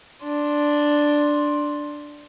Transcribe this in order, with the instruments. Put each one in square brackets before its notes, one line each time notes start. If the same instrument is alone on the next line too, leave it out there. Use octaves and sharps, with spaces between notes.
[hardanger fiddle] D4 C6